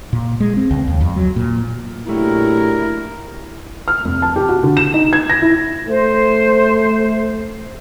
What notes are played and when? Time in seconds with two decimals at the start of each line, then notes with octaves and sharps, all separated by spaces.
0.13 A#2
0.40 G#3
0.57 C4
0.71 C#2
0.88 D#2
1.01 F2
1.16 F#3
1.36 A#2
2.07 A#2 F#3 A3 D4 E4 G4 A#4
3.88 F6
4.04 F1
4.22 A5
4.36 G4
4.49 F#4
4.63 D3
4.77 E7
4.94 D#4
5.13 G#6
5.30 A#6
5.42 E4
5.89 A3 C5